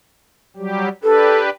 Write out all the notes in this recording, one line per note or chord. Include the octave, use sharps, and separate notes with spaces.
F#3 G3 G4
D4 G4 A4 B4